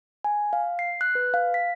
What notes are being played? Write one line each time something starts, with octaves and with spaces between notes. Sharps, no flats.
G#5
F5
C7
F#6
B4
F5
B6